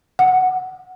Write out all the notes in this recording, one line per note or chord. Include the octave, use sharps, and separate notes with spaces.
F#5